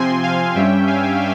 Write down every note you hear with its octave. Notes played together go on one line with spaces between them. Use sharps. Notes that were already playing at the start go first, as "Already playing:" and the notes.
Already playing: C3 F3 C4 G#5 C6
F5 G#5
G2 G3 C#4 E5 G5
F5 G#5